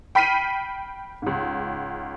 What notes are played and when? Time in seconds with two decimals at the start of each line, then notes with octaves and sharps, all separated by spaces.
0.15 G5 B5 F6 B6 C7 D#7
1.22 C#2 G#2